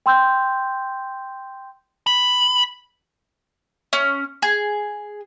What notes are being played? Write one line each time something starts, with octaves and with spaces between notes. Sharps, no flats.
G5 C6 E6 G6
B5
C#4
G#4